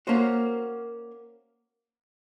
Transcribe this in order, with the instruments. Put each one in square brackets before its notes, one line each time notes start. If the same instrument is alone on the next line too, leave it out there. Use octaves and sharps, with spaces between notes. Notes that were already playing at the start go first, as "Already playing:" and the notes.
[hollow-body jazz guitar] A#3 C#4 F#4 C5